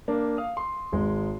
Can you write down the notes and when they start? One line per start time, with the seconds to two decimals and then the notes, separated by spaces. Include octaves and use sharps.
0.08 A#3 D4
0.37 F5 D#6
0.57 C6
0.92 G#1 G#3